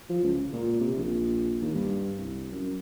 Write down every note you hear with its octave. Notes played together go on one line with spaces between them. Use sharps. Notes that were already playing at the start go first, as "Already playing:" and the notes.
F3
C#2
A#2
C3
A#1
D#2
G2
C2
F#2